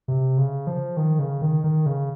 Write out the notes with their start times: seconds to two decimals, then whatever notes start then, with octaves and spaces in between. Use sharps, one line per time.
0.08 C3
0.38 C#3
0.67 F3
0.97 D#3
1.19 C#3
1.41 D#3
1.64 D#3
1.86 C#3